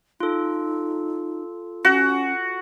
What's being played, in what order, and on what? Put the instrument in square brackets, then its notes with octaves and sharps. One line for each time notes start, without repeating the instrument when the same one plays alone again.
[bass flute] D#4 [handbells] F4 A4
[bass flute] C#4 [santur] F#4